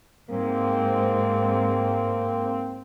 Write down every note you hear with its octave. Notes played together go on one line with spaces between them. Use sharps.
G#2 A#3 C4